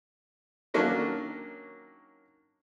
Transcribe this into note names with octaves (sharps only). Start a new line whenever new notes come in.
D#3 F#3 A#3 C#4 D4